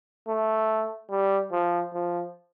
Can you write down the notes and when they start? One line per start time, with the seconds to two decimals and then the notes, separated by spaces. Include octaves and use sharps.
0.28 A3
1.10 G3
1.52 F3
1.94 F3